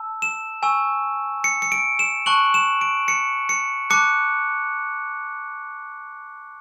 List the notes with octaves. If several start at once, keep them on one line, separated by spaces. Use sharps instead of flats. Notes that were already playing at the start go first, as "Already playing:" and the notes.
Already playing: A5 E6
E7
G#5 C#6 E6
C#7
C#7
D7
E7
A5 C#6 F#6 F#7
E7
D7
C#7
C#7
A5 D6 F#6 C#7